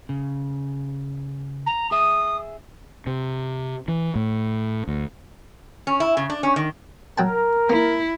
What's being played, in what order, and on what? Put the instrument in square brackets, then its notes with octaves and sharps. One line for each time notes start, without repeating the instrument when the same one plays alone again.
[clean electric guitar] C#3
[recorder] A#5
[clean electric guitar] G#4 E5 [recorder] D#6
[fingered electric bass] C3
E3
A2
D2
[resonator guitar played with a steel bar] C#4
E4
C#3
D4
C#4
D#3
[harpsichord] F#3 G5 A5 [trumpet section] A#4
[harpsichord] A#3 [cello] E4